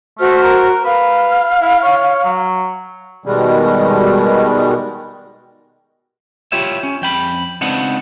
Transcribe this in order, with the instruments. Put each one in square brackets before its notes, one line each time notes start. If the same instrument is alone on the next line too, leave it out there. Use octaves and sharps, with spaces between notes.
[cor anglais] A3 [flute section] F#4 C5 F6
[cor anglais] A#4
[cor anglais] B4 [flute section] F5 F6
[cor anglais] E4
C#5
F#3
[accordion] B2 D#3 G3 G#3
[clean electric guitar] E4 F4 G4 C#5 E5
C#4
F2 G5 B5
C#2 B3 C4 D4 D#4 F#5